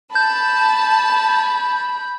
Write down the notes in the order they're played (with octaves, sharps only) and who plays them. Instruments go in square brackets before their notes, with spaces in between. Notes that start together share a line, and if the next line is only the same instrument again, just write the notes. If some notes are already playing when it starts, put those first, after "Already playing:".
[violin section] A5 [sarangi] B5 [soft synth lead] G6